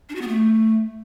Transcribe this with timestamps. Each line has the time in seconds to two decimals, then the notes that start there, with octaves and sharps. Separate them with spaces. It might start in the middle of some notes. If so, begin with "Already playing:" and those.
0.09 D4
0.15 F#4
0.22 B3
0.28 A3